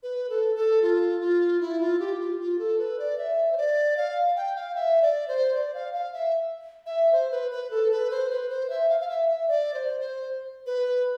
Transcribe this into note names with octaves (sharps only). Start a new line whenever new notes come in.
B4
A4
A4
F4
F4
E4
F4
G4
F4
F4
A4
B4
D5
E5
C5
D5
F5
G5
F5
E5
D5
C5
D5
F5
F5
E5
E5
C5
B4
B4
A4
B4
C5
B4
C5
E5
F5
F5
E5
E5
D5
C5
C5
B4